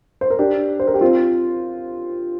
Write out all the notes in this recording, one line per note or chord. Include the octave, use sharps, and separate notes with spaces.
C5
A#4
D4 G4
C5
A#4
G4
C4 F4